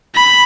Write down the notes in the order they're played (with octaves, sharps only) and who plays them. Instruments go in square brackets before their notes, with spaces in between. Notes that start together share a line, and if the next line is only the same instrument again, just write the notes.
[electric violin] B5